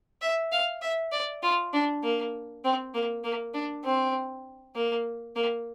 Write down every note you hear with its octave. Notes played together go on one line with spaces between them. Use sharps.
E5
F5
E5
D5
F4
D4
A#3
C4
A#3
A#3
D4
C4
A#3
A#3